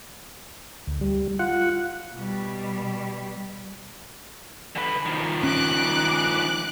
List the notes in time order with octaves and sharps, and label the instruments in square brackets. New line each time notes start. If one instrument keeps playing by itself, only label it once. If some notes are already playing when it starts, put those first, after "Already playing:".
[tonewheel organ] D2
G3
F4 F#5
[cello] B2 G3
[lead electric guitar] D3 B4
D#3 F3
[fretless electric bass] C#4 [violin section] D6 F#6